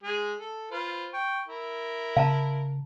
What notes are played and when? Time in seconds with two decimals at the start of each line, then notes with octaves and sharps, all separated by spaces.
0.03 G#3 G#4
0.38 A4
0.71 F4 B4 C5
1.13 G5 C#6
1.47 E4 A#4
2.17 C#3 F5 A5 A#5